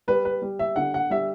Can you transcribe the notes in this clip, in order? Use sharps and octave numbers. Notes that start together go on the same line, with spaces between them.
G3 B4
B4
G3
E5
D3 F#5
F#5
G3 E5